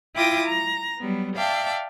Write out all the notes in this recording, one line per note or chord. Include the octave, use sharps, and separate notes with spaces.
E4 F4 G5 D6 D#6 A#6
A#5
F#3 G3 B3
D5 E5 F5 G5 A5